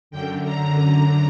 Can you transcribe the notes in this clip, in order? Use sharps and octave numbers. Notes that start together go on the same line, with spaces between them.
F#2 D3 G5
A#5
A#5